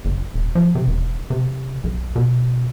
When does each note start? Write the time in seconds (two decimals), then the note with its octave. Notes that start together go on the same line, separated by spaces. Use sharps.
0.05 F#1
0.34 D#1
0.55 F3
0.75 C3
0.87 E1
1.30 C3
1.84 B1
2.16 B2